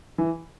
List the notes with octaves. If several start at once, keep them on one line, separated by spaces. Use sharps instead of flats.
E3